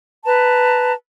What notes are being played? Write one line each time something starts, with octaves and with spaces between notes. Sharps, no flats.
B4 A5 A#5